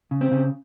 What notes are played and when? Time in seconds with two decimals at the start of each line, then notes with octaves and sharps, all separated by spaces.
0.11 C#3
0.21 C4
0.32 C#3